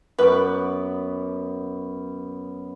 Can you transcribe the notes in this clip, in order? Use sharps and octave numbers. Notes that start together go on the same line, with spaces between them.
F#2 B3 B4 D6